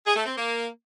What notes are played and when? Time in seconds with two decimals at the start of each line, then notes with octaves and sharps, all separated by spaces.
0.05 G#4
0.16 A3
0.26 C4
0.36 A#3